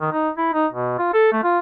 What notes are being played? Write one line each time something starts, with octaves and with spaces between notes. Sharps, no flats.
D#3
D#4
E4
D#4
B2
F4
A4
A3
F4